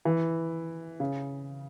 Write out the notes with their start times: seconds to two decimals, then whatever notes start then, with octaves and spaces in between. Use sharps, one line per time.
0.05 E3
1.00 C#3